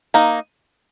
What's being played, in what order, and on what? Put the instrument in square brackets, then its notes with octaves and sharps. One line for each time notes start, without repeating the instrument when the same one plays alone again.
[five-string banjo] A#3 D#4